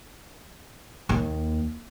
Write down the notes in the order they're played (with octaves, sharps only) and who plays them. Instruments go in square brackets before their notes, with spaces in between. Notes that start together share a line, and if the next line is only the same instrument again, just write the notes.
[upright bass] D#2